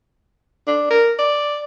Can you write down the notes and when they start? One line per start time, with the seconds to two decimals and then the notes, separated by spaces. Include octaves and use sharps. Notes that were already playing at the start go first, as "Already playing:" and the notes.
0.67 D4
0.91 A#4
1.19 D5